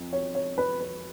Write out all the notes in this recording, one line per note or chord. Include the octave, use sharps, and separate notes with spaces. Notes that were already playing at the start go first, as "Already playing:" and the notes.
Already playing: F2
C#5
C#5
B4
B4